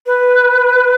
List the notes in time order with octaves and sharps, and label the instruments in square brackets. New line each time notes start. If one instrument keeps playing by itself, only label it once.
[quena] B4